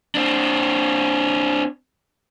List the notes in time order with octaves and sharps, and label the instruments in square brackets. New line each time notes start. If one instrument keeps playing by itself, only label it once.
[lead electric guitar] C4 D4